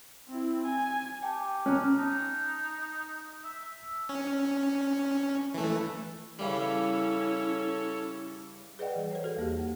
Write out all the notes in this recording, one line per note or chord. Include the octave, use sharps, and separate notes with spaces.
C4 E4
G#5
G4 G5 A5
C#4 A#5 F6 F#6
D#4 A5
E5
C#4
E3 A3
C#3 E3 G3 C#4 E4 A4 C#5
G#4 B4 D5 D#5 F#5 G5
E3 G3
A4 C5 C#5
F#4 G#4 A4
E2 A#3 G4
F2